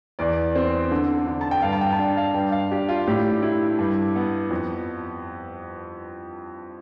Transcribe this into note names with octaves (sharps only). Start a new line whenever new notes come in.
E2 D5
C4
D3
D3
A5
G5
G2 F5
A5
G5
A5
D4 G5
F5
G2 G5
F5
D4 G4
F4
A2 G4
E4
G2
B3
F2